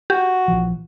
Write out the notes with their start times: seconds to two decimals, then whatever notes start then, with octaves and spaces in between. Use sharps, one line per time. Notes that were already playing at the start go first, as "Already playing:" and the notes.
0.10 F#4 G4
0.48 A#1 E3 F3